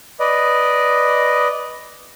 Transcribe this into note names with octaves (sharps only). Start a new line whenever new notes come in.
B4 D5 D#5